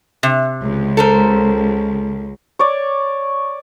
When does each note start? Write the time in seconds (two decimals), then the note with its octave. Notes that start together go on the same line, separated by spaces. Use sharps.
0.23 C3
0.62 C#2
0.97 A4 A#4 C5
2.59 C#5 D5